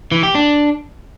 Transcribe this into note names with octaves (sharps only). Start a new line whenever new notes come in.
E3
G4
D4